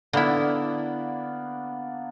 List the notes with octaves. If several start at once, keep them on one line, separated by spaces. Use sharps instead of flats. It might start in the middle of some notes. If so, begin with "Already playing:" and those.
D3 A#3 B3 D4 E4